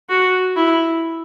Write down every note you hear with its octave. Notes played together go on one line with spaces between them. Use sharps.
F#4
E4